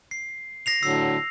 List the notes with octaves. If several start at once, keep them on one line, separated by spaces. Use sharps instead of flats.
C7
A#6 C7 F7
A2 D3 F#3 E6 C7